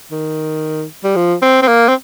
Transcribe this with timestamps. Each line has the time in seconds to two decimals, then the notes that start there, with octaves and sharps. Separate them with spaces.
0.11 D#3
1.04 G3
1.16 F3
1.42 C4
1.62 C4
1.68 A#3
1.88 C4